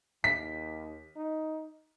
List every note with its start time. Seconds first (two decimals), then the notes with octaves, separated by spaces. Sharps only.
0.24 D#2 B6
1.16 D#4